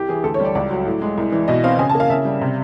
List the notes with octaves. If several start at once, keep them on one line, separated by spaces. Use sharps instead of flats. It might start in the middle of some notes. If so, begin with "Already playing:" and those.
Already playing: C2 G4
E3 G#4
D2 A4
C#5
G3 D5
C#2 D5
F#3
A2
G#3
C2
E3
B2 D#5
C4 F5
C#3 G#5
A5
A#3
F5
C#3 E5
G3
C3